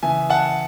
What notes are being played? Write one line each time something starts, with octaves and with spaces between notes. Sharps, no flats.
C#3 E3 E5 G#5
F#5 A5